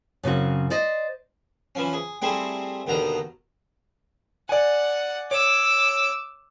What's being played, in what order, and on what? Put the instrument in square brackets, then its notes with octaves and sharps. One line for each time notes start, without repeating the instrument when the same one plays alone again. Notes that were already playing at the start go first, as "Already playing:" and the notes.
[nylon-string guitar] F#2 C#3 C4 F#4
C5 D5 D#5
[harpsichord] E3 F3 C#4
G#4
G3 A3 C4 E4 G#4
D#2 B2 D3 D#3 A#5
[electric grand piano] D5 G#5 [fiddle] F#5
[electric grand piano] C#5 [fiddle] D6 E6